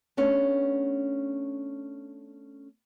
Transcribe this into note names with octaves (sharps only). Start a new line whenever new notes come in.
A3 B3 C#4 D4